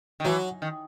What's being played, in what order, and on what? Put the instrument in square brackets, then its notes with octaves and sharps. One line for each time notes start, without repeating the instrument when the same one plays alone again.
[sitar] D#3
[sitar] E3 [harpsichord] F#3
[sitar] D#3